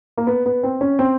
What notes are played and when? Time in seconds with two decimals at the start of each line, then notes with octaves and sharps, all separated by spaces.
0.17 A#3
0.27 B3
0.46 B3
0.63 C4
0.81 C#4
0.99 C4